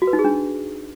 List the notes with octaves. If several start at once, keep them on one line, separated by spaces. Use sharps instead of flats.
F#4
B4
D#4
G#4
D4